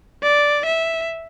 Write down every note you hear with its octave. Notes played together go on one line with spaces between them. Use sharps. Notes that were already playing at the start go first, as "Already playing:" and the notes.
D5
E5